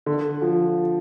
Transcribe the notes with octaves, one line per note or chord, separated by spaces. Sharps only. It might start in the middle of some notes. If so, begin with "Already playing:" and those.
D3
F3